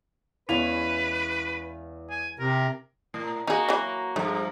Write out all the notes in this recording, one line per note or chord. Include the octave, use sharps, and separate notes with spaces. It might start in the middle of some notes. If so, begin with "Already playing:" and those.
E2 E3 G#3 C#4 B4 F5 F7
G#5
C3 A#4
A2
A#3 D#4 F#4 G#4
E3 F#3
G2 F3 A3